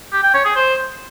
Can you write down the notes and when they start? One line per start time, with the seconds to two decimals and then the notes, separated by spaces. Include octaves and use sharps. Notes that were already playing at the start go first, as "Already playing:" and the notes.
0.12 G4
0.23 G5
0.34 C#5
0.45 G#4
0.56 C5